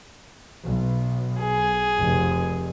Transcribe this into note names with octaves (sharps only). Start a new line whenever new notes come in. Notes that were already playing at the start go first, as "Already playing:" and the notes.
B1
G#4
F1